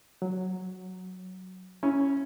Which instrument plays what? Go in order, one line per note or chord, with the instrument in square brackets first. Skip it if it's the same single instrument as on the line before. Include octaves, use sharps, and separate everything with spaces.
[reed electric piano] F#3
[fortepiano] C#4 [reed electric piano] E4